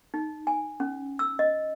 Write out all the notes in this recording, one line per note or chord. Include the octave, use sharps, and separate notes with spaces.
D#4
G#5
C#4
E6
D#5